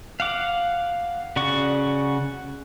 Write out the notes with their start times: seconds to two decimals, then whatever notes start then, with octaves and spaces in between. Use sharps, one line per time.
0.20 F5 F#5 D6
1.36 C#3 F#4 D5 F#5 C#6